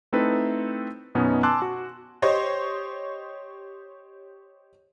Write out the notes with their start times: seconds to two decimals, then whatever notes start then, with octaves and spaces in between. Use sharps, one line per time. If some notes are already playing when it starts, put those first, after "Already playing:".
0.13 A3 C4 D#4 E4 A4 B4
1.15 F#2 B2 B3 C#4 D#4
1.43 G#5 A5 C6 D6 E6 F#6
1.62 F#4
2.22 G4 C5 C#5 D#5